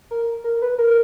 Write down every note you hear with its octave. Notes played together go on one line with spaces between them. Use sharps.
A#4
A#4
B4
A#4